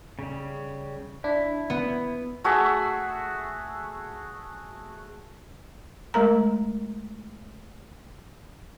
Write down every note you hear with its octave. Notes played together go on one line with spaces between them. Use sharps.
C#3 G3
D4 E4
B3
A3 F#4 G#4 E5
G#3 A3 A#4 A#5